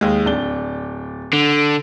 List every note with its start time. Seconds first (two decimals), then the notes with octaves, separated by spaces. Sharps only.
0.01 D#2 G#3
0.25 D1 D4 G7
1.33 D3